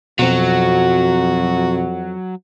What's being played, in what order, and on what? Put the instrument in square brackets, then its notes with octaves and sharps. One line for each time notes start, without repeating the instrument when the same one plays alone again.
[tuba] F2 [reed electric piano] B2 C4 [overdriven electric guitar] F#3 [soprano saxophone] F#4